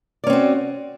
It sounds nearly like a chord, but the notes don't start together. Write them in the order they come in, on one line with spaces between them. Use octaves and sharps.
D5 C#4 C4 F#4